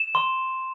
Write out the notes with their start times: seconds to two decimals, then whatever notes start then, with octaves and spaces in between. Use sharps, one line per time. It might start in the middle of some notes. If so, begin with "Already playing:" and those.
Already playing: E7
0.15 C6